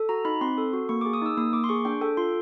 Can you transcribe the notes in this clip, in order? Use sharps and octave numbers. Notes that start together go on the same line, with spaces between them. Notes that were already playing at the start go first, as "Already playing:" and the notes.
Already playing: A4
F#4 A#5
D#4 B5
C4 C6
A4
F#4
A#3 C#6
G#4 D6
D#6
D#4 E6
A#3 D#6
A#3 D6
C6
G#4 C#6
D4 G5
A4 G5
F4 C6